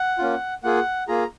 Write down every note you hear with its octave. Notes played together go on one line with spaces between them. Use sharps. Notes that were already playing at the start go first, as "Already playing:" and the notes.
Already playing: F#5
A#3 C#4 F4
A#3 F4 G#4 F#5
A#3 F4 G#4 A#5